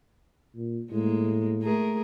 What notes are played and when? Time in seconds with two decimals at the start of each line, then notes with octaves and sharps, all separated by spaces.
0.56 A#2
0.92 A2 G#3 A#3
1.62 A3 G#4 A#4